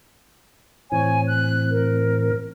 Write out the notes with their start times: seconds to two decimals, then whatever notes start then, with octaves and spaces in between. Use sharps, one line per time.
0.92 A2 E3 C4 C#5 G#5
1.27 F#6
1.70 A#4